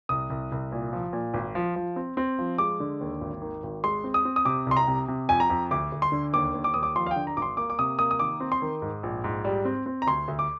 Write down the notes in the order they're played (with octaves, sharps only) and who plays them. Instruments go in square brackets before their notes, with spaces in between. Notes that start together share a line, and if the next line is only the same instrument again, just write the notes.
[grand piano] C2 D#6
C2
C2
A#2
F3
A#2
G#1
F3
F3
C4
C4
F3
G#3 D6
D3
D#2
G#1
D#3
G#1
G#3 C6
C4
D#6
C4
D#6
C3 D6
C2 C6
A#5
C3
C3
F2 G#5
A#5
F2
D2 D6
D2
C6
D3
D#2 D6
D#2
D6
D#2 D#6
D6
F3 C6
F5
D3 G5
A#5
G#1 D6
C6
A#3 D6
D6
C3 D#6
A#3 D#6
D#6
D#3 D6
C4
C6
D#3
G#2
A#1
G#2
G3
C4
C4
A#5
D2 C6
D2
D6